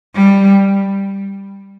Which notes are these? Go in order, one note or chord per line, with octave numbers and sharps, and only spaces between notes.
G3